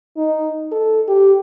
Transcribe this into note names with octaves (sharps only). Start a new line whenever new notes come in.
D#4
A4
G4